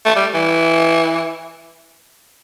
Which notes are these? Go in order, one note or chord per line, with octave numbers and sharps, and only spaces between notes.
A3
G3
E3